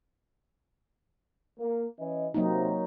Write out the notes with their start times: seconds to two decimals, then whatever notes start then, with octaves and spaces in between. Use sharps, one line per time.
1.60 A#3
1.99 E3 C#4 D#5
2.34 C3 F#3 A#3 D#4